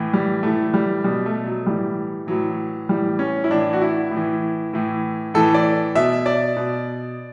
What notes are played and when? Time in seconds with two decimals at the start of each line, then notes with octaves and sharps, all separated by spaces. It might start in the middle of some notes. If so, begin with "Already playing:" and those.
Already playing: A2 E3
0.13 G3
0.43 A2 E3 A3
0.74 G3
1.04 B2 G3
1.26 A3
1.46 F#3
1.66 A2 E3 G3
2.27 A2 E3 F#3
2.89 A2 E3 G3
3.19 C#4
3.44 E4
3.51 A2 E3 D4
3.73 F#4
3.82 E4
4.11 A2 E3
4.73 A2 E3
5.34 A2 E3 A4
5.54 D5
5.95 B2 E5
6.26 D5
6.56 B2